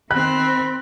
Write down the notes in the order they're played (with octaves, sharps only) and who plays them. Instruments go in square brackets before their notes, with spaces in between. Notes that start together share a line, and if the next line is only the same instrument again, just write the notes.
[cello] D#3 C4 [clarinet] B5 [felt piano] F#6